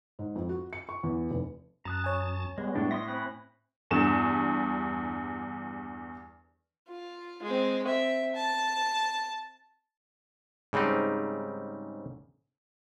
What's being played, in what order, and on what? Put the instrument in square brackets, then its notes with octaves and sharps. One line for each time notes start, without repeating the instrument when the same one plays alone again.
[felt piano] G#2
F2
F#4
C#7
C#6
E2
F1
[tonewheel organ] F#2 A5 [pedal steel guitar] A#5 D#6 F#6
[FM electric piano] C#5 G#5
[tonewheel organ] G3 B3 [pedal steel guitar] G#3
[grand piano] A2 [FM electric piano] G#3 [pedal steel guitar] D4
[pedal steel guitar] E5 C6 D#6 [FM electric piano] A#6
[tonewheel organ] C4 [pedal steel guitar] G#5 B5 F#6
[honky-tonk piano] E2 G2 E7
[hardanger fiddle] F4
G#3 C4
C4 E5
A5
[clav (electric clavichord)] G#2 C#3 G3 C4 D#4